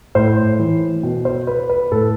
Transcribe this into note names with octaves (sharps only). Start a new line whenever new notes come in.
A2 C5
E3
B2
C5
B4
B4
A2 A4